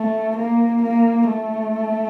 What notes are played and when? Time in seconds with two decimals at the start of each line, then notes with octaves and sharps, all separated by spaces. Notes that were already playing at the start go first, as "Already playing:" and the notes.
Already playing: A3
0.37 A#3
0.83 A#3
1.29 A3